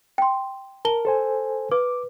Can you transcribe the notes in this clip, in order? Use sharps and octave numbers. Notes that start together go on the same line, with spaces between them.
G5 C6
A#4 A5 G7
A4 C5 G#5
B4 D6